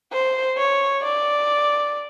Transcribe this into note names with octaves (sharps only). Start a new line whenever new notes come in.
C5
C#5
D5